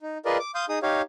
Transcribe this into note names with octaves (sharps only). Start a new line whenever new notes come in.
D#4
F4 G#4 A#4 B4 D5 D#5
D6
F5 C6 D#6 G6
D#4 G#4 D#6
D#4 G4 C#5 F5